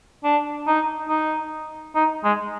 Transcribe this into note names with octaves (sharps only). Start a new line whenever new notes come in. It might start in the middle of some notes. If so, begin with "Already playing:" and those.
D4
D#4
D#4
D#4
G#3